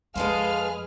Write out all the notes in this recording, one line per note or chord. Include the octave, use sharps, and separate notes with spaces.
F2 G#3 G#4 A4 B4 C5 F5 F6